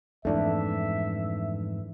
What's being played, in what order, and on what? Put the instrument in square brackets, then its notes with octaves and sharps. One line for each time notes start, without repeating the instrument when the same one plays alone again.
[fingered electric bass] F2 G#2 E3 [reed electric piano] A3 D4 [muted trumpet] E5